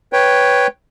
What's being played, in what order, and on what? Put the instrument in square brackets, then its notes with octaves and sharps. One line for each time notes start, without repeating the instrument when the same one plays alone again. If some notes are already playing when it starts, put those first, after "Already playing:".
[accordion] B4 C#5 G5